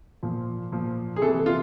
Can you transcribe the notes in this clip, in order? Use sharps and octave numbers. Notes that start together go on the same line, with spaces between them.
A#2 F3
A#2 F3
G#4
C3 E3 A4
F4